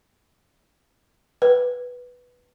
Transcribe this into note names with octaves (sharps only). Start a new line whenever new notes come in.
B4